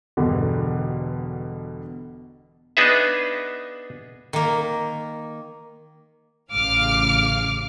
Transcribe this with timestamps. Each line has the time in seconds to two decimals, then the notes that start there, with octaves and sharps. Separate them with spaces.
0.17 E1 G2 B2 D3
2.77 B3 D4 D#4 G#4 B4 E5
4.33 D#3 A#3
6.52 A1 C#3 F5 D6 F6